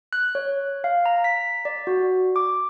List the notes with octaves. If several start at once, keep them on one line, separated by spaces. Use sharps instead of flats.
F#6
C#5
F5
A#5
B6
D5
F#4
D6